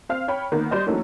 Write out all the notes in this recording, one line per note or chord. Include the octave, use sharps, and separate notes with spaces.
C4 F5 F6
C#5 G5 B5
D#3 A#3 B3
G3 C5 D5 D#5
E3 F#3 A3 A#3 C#4 D#4